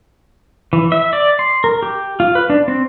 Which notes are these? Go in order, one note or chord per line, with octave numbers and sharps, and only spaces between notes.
E3
E5
D5
C6
A#4
G4
F4
B4
D4
C4